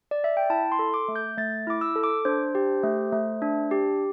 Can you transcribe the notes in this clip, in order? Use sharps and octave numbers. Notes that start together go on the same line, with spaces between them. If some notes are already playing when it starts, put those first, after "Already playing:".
D5
E5
G5
E4 A5
C6
A4
D6
A3
G6
A3 A6
E4 D6
E6
A4
D6
D4 C5
G4
A3
A3
D4
G4